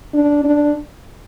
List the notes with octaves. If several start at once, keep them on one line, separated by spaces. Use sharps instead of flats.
D4
D4